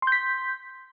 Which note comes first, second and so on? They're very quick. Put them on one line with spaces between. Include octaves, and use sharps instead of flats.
C6 G6 B6